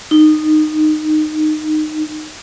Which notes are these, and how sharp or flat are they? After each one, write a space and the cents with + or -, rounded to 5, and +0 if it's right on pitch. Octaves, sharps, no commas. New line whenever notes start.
D#4 -15